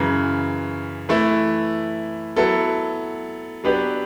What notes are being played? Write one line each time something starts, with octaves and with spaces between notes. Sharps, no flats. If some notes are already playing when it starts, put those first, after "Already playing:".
Already playing: F#2 C#3 E3
E3 A3 E4
F#3 B3 E4 A4
F#3 B3 D4 G4 B4